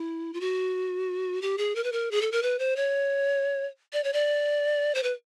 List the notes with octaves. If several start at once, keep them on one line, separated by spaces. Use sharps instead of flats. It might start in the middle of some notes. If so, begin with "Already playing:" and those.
Already playing: E4
F4
F#4
G4
G#4
A#4
B4
A#4
G#4
A4
A#4
B4
C5
C#5
D5
C#5
D5
C5
B4